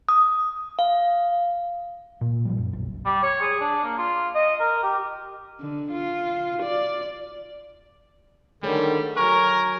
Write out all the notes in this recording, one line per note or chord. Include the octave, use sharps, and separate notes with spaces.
D#6
F5
A#2
A#1 F3 G3
F#2
F#1 B1
G3
C#5
G#4
D4
A#3
F4
D#5
A#4
G4
D3
F4
D5
D3 D#3 G3 A3 G#4 C#5
F#3 A#4 G#5 C#6